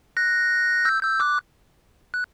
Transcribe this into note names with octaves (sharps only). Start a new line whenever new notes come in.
F#6 A#6
E6 G6
E6 G6
D6 F#6
F#6